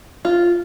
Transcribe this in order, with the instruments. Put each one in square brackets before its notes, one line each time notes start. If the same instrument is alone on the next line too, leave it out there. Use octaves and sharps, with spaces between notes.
[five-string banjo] F4